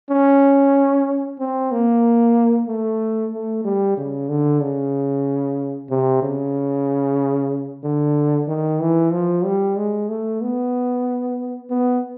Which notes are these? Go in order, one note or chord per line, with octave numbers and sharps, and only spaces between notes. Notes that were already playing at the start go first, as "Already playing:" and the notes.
C#4
C4
A#3
A3
A3
G3
C#3
D3
C#3
C3
C#3
D3
D#3
E3
F3
G3
G#3
A3
B3
B3